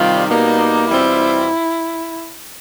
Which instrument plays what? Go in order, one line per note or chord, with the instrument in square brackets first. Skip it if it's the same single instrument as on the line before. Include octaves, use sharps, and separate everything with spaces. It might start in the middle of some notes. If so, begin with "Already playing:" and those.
Already playing: [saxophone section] C3 D#3 G3 [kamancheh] F4
[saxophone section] B2 G3 A#3 [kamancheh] D#4
[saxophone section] E2 B2 G3 C4 F4 [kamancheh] E4